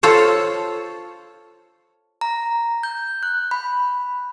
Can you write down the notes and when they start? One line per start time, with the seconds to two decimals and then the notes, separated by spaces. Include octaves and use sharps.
0.03 F4 A4 C5 C#5
2.21 A#5
2.83 G6
3.23 F#6
3.51 B5